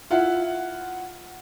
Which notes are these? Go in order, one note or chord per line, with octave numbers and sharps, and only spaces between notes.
E4 F4 F#5